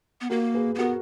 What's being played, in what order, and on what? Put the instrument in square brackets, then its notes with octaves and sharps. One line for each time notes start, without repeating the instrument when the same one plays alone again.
[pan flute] B3
[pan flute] A#3 [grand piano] F#4 A#4
[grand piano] G#4 B4
[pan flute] A#3
[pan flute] B3 [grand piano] F#4 A#4